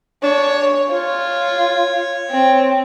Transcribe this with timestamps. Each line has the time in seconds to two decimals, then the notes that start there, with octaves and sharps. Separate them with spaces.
0.23 D4 C#5
0.90 F4 C#5
2.31 C4